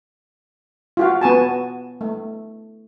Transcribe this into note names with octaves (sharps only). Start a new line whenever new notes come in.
F4 F#4 F5
B3 F#4 G#5 A5
A3